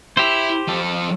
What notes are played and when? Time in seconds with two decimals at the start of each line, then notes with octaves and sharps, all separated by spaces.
0.17 E4 G4 C5
0.68 F3 A4